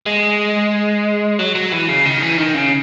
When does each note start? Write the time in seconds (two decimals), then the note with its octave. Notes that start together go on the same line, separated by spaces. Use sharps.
0.06 G#3
1.39 F#3
1.55 F#3
1.72 E3
1.89 C#3
2.05 D#3
2.22 E3
2.38 D#3
2.54 C#3